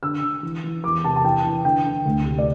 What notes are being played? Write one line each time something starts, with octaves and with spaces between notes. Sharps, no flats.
D3 E6
D3
E3
E3
E2 D6
C3 A5
A5
E3 G5
E3
D3 G5
D3
D2
C3
D5